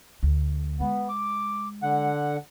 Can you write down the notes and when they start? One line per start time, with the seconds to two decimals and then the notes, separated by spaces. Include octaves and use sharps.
0.23 D2
0.80 G#3 B3
1.09 D6
1.83 D3 F#5